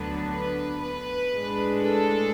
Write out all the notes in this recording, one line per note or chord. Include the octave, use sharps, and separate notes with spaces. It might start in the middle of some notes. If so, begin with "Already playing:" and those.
Already playing: D2 D3 F#3 B3 D4 B4
B4
B4
A2 G#3 D4
A4